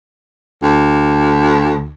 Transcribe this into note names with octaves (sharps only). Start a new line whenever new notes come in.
D2